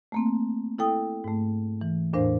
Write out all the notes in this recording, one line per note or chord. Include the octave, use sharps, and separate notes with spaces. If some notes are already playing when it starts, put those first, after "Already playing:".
A3 A#3 C4
E4 A4 G5 D#6
G#2 A3
E3
E2 A2 D4 A#4 C5 F5